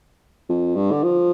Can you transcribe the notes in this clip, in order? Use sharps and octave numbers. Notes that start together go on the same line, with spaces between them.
F2
G2
D3
F3